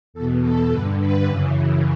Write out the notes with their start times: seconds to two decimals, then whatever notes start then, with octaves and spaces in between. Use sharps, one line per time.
0.14 E2 A4
0.18 B2
0.42 A4
0.71 G2 D3 B4
0.99 B4
1.28 F#2 C#3 E3